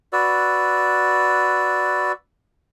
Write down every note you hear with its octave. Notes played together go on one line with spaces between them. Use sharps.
F#4 B4 D5 E6